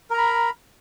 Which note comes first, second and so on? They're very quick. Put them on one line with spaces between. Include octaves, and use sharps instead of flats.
A#4 A#5 B5